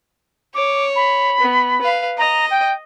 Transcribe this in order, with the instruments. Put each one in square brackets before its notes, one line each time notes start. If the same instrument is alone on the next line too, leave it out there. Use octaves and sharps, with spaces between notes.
[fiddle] C#5 [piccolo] D6
[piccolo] B5
[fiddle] B3
B4 F5
[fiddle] D#5 [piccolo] A#5
[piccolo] G5